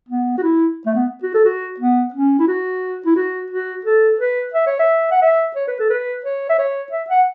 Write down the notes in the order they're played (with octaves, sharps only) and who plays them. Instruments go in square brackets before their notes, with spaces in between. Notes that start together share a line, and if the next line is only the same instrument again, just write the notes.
[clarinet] B3
F#4
E4
A3
B3
F#4
A4
F#4
B3
C#4
E4
F#4
E4
F#4
F#4
A4
B4
E5
C#5
E5
F#5
E5
C#5
B4
A4
B4
C#5
E5
C#5
E5
F#5